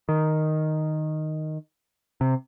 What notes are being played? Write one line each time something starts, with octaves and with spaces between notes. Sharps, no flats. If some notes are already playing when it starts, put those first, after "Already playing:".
D#3
C3